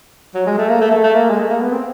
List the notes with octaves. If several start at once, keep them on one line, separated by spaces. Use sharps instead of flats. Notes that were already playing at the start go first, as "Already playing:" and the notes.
F#3
G#3
A3
A#3
A3
A3
A3
A#3
G#3
A3
A#3
B3
C4